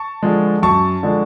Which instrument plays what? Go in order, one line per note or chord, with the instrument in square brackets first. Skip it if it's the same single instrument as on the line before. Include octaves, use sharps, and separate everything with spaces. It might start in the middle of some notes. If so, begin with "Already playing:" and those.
Already playing: [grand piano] A5 C#6
D3 F3 G#3
F#2 A5 C#6
D3 F3 G#3